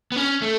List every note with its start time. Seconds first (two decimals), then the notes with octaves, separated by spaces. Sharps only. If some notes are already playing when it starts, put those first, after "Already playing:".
0.12 B3
0.16 C#4
0.42 A3